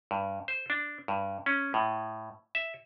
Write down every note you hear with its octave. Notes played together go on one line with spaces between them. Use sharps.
G2
C5
D4
G2
C#4
A2
E5